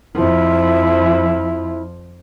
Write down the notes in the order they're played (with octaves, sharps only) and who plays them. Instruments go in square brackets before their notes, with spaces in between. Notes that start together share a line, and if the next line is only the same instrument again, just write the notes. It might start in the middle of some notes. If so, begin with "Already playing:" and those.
[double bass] F2 F3 [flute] E4